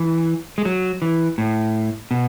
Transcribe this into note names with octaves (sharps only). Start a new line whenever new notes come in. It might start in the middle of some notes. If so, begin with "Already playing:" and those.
Already playing: E3
G#3
F#3
E3
A2
B2